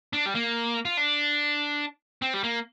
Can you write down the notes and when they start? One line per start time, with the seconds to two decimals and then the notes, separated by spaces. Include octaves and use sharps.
0.13 D4
0.26 G3
0.35 A#3
0.85 F4
0.97 D4
2.22 C4
2.34 G3
2.44 A#3